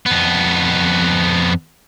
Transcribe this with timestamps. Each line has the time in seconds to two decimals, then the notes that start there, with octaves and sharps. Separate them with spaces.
0.06 F2 B3